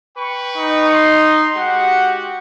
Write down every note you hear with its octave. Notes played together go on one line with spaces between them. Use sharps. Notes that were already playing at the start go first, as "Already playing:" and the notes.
B4 G5 C#6
D#4
C6
G#3 F#4 G4 F#5